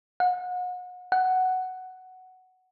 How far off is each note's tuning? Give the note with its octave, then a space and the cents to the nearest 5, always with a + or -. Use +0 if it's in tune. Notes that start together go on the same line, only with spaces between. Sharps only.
F#5 -35
F#5 +5